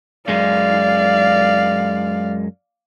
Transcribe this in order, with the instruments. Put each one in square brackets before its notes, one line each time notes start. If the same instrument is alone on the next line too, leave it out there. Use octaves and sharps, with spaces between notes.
[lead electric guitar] F#2 G#3 [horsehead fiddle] D5 F5